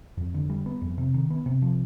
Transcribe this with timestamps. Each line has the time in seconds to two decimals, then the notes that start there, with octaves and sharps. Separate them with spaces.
0.17 F2
0.34 D3
0.50 G3
0.66 B3
0.81 F2
0.98 C3
1.14 D#3
1.30 B3
1.46 C3
1.62 F3